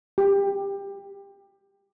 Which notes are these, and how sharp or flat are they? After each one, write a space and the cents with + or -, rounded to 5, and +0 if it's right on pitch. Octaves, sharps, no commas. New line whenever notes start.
G4 +20